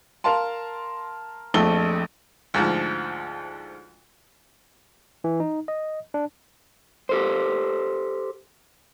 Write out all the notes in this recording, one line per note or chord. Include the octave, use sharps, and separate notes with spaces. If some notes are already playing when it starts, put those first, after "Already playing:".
A#4 F5 A5 C6
A#1 F2 A3 G7
D2 G#2 F3
E3
D#4
D#5
D4
G4 A4 C5